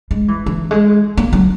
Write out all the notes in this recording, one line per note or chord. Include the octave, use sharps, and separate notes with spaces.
G#3
E3
E3
G#3
A#3
F#3